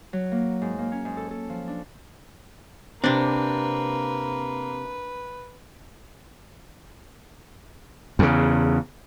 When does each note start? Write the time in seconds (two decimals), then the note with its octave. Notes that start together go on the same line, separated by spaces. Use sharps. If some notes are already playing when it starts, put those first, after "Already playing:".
0.13 F#3
0.32 A#3
0.62 G#2
0.78 A#3
0.92 C#4
1.05 G#2
1.17 A4
1.31 A4
1.50 F3
1.68 D4
3.04 C3 A#3 C4 D4 B4
8.19 E2 C#3